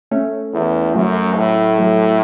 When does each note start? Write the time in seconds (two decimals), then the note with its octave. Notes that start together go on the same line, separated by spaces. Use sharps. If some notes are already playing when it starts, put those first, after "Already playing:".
0.11 A3 C#4
0.53 E2
0.95 F#2 F#3 A3
1.37 A2
1.78 F#3 A3